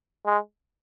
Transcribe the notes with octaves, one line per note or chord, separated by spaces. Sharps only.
G#3